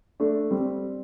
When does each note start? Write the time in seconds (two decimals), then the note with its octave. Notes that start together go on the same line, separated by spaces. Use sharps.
0.20 A3 D4
0.51 G3 C4